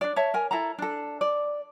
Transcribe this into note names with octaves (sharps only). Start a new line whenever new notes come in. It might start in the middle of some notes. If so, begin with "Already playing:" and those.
D4 D5
C#5 E5 A5
A#4 G#5
E4 A4 A5 A#5
D4 A4
D5